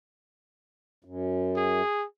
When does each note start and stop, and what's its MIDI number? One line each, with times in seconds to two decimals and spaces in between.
1.05 1.82 42
1.56 2.05 68